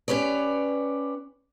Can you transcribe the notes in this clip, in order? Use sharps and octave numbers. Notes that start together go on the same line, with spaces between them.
C#4 G4 B4 C#5 D5